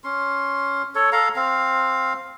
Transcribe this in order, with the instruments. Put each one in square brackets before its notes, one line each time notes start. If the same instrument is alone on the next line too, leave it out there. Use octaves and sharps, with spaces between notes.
[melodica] C#4 C6
A4 C#5
A4 F5 A#5
C4 F5